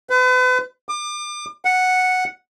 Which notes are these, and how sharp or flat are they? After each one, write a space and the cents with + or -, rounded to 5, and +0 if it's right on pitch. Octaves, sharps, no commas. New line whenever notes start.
B4 +40
D6 +35
F#5 -5